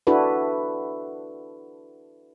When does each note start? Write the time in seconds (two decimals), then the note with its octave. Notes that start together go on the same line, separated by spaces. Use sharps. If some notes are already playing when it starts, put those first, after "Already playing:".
0.07 D4 E4 F#4 A4 B4